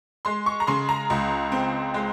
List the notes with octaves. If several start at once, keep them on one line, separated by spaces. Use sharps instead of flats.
G#3 C6
C#6
A#5
C#3 C6
A#5
C#2
C4
G#3